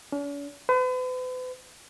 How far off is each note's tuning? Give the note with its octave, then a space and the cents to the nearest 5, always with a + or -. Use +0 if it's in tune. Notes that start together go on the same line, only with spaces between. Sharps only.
C#4 +45
B4 +45